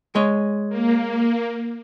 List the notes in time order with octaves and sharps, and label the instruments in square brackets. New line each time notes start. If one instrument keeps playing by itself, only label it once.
[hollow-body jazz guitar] G#3 C#5 D#5
[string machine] A#3